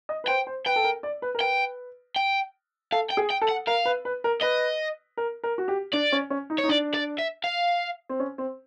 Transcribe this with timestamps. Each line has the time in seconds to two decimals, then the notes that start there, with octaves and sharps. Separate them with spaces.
0.09 D#5
0.24 B4
0.27 C5 G5
0.47 C5
0.66 B4 G5
0.76 A4
0.84 A#4
1.03 D5
1.22 B4
1.35 A#4
1.41 B4 G5
2.16 G5
2.92 A4 F5
3.10 G5
3.17 G#4
3.30 G5
3.42 A4
3.49 F#5
3.67 A#4 F5
3.85 B4
4.05 B4
4.24 A#4
4.42 B4 D#5
5.17 A#4
5.43 A#4
5.58 F#4
5.68 G4
5.93 D4 D5
6.12 C#4
6.30 C#4
6.50 D#4
6.58 C#5
6.64 D#4
6.68 D4 D5
6.94 D5
7.18 E5
7.44 F5
8.09 C4
8.20 C#4
8.38 C4